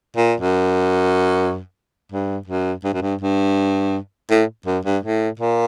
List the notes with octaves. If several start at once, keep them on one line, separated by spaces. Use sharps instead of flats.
A#2
F#2
G2
F#2
G2
F#2
G2
G2
A2
F#2
G2
A2
A#2